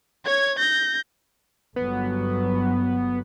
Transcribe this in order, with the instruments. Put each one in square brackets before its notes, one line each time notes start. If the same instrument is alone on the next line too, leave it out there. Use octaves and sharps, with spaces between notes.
[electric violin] C#5 G#6
G6 A#6
[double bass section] G1 F#3 [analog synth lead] B3